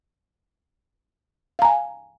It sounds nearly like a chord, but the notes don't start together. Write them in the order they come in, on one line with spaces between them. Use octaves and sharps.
F5 A#5 G#5